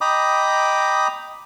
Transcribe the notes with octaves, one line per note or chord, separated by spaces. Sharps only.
D#5 G5 A#5 B5 D6 D#6